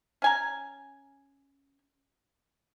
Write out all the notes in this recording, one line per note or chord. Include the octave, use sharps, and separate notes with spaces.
C#4 G#5 A#5